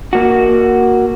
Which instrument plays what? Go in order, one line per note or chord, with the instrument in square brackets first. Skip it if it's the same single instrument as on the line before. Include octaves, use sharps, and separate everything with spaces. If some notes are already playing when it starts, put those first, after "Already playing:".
[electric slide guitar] A#3 F#4